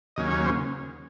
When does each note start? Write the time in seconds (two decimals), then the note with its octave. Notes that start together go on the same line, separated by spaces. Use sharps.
0.16 D#2 C#3 F#3 A#3 C#4 D#5
0.31 C#5
0.45 C5